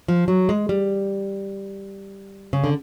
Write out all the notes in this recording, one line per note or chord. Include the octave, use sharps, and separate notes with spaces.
F3
F#3
G#3
G3
C#3
D3